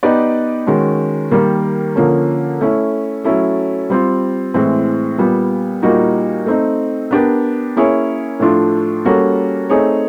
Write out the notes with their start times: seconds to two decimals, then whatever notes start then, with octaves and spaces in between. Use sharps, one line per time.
0.03 B3 D#4 G4 B4 D5
0.67 D#3 G#3 C#4 F#4
1.31 D#3 G3 A#3
1.96 D3 F3 A#3 C#4
2.61 A3 C#4 E4
3.24 F#3 A3 C#4 E4 A4
3.90 G3 C4 F4
4.54 A2 E3 G#3 C4
5.18 A#2 G3 B3
5.83 A#2 G3 A#3 D#4 F#4
6.46 A3 C4 D#4
7.11 B3 D4 G4 A#4
7.76 A#3 C#4 E4 G#4 C#5
8.40 A2 F3 A3 D4 F4
9.05 G3 A#3 C#4 F#4 A4
9.70 A3 C4 D#4 G#4 C#5